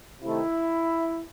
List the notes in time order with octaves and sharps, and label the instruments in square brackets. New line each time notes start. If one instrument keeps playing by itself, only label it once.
[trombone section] C3 D#3 A3 E4